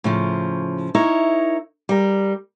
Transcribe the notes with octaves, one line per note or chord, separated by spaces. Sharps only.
A2 C#3 F3
D#4 E4 A#4 C#5
G3 A#4